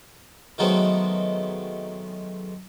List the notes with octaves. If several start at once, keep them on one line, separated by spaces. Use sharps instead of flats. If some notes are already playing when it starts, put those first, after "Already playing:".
D#3 F#3 G#3 A3 B3 C4